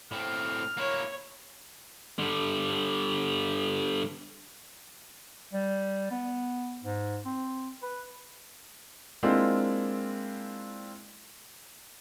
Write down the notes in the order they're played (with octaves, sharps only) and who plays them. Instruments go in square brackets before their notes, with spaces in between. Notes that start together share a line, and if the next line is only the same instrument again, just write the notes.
[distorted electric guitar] A2 C4 [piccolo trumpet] F6
[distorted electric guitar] A#3 E4 [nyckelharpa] C#5
[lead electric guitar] D3 G3
[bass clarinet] G3
B3
G#2
C4
B4
[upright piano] G#3 A#3 C4 D4 E4 F4